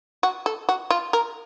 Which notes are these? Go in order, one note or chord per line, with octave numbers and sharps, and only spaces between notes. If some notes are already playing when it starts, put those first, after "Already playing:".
F#4
A4
F#4
F4
A#4